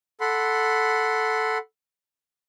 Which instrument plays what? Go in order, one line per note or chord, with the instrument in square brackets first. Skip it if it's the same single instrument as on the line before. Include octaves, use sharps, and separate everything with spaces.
[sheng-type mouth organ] A4 F#5 B5 C6